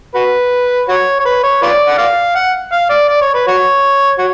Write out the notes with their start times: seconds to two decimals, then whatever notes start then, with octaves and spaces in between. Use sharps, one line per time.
0.15 F#4 B4
0.88 F#4 C#5
1.19 C#5
1.25 B4
1.43 C#5
1.62 F4 B4 D5
1.88 F#5
1.98 D5 F5
2.35 F#5
2.72 F5
2.90 D5
3.09 D5
3.21 C#5
3.35 B4
3.47 F#4 C#5
4.18 F#4 C#5